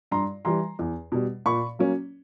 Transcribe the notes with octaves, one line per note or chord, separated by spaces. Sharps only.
G2 A#5 C6
E3 G3 A#5 C6
E2
B2 G3
A#2 B5 C#6
F#3 A#3 C#4